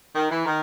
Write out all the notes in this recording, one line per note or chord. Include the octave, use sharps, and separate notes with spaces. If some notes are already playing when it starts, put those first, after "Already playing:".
D#3
E3
D#3